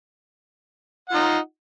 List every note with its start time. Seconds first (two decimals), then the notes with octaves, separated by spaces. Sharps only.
1.09 F#5
1.12 F4
1.15 D#4